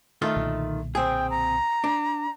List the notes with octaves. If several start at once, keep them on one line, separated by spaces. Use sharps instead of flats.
D#3 A3 F4
B1 A#2 D3
C4 G#4 G5
A#5
D4